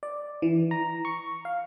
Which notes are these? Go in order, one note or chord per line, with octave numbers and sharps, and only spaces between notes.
D5
E3
A#5
C#6
F5